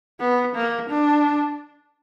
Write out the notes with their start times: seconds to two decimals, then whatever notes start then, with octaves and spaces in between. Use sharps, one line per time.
0.20 B3
0.55 A#3
0.90 D4